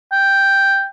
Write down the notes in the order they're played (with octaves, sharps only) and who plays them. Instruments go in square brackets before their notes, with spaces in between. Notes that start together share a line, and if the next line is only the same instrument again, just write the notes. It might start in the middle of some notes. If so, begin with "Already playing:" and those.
[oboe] G5